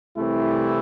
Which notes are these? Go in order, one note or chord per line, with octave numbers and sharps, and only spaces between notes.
C2 C3 E3 A3 E4